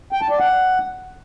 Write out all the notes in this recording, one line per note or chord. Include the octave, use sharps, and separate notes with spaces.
G5
A5
D5
F#5